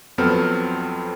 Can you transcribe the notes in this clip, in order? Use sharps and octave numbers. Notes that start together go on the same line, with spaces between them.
F2 F#3 B3 C4 A4 F6